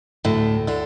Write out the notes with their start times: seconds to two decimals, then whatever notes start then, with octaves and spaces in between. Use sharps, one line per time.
0.25 D2 A2
0.68 A2 D3